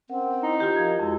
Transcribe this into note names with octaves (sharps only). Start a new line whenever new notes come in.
C4 C#4 A#4 F#5
D#4 E4
D#3 F4 G4
F3 A#4 D#5 G#6
F2 G#3 E4 F#4 E6